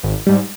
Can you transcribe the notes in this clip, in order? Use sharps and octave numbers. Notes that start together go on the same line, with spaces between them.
G#1
G#2 G3